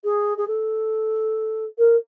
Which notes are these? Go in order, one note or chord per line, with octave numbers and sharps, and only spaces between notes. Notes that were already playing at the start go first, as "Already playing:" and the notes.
G#4
G#4
A4
A#4